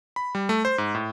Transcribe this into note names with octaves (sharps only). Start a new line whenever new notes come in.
B5
G3
A3
C5
G#2
A2